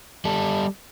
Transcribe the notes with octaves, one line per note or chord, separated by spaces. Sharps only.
G3 A4